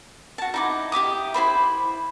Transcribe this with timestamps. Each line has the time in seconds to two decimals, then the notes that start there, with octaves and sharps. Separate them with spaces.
0.38 F#4 A5
0.54 D#4 E4 D6
0.92 G4 E5 D6 D#6
1.34 E4 G#4 C5 B5